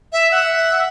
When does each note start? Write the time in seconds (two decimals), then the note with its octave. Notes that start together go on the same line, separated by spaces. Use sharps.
0.13 E5
0.32 E5 F#5